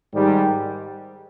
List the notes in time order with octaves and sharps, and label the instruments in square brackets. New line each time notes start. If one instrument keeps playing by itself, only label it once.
[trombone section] G#2 D#3 G3